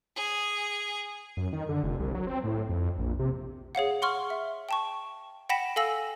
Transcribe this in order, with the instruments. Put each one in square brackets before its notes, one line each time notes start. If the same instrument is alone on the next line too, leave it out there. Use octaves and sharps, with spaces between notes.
[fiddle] G#4
[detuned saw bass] F#2
D#3
D3
F1
C2
F#3
C4
A2
F2
A#1
C3
[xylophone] G#4 C#5 F5 F#5
F#5 C6 C#6 F6
E5
G5 A5 C#6
F#5 G5 B5 A#6 B6 E7
A4 F5 G#5 E6 A#6 F#7